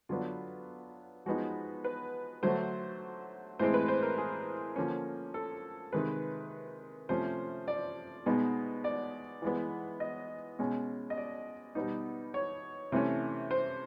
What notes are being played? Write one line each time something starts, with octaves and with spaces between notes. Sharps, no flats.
D3 F#3 B3 D4 F4
F3 G#3 B3 D#4 F#4
B4
D3 F#3 A3 C5
A2 E3 G#3 C4 C5
B4
C5
A#4
G#4
D3 F3 A#3 C#4
A4
C3 D#3 G#3 B4
C3 F3 A3 C#4 C5
D5
B2 G#3 B3 D#4
D5
E3 G#3 B3
D#5
B2 G#3 C#4
D#5
D5
B2 G3 B3 D#4
C#5
C3 E3 A3 C#4
C5